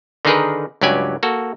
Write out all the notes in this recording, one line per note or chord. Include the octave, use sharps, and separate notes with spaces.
D3 D#3 D#4 G#4 A#4 B4
C#2 G2 F#3 G4 D5 G#5
A#3 F#4 A4